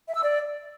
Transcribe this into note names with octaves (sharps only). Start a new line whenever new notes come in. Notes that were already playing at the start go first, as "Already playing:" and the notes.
E5
E6
D5